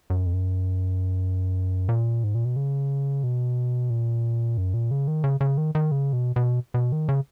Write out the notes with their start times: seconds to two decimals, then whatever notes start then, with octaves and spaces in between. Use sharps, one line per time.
0.10 F#2
0.26 F2
0.33 F#2
1.89 A#2
2.24 G#2
2.35 A#2
2.45 B2
2.56 C#3
3.23 B2
3.90 A#2
4.57 F#2
4.74 A#2
4.91 C#3
5.08 D#3
5.24 C#3
5.41 C#3
5.58 D#3
5.75 D#3
5.91 C#3
6.13 B2
6.36 B2
6.74 B2
6.92 D#3
7.09 C#3